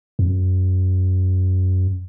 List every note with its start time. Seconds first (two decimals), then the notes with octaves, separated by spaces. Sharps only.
0.19 F2
0.26 F#2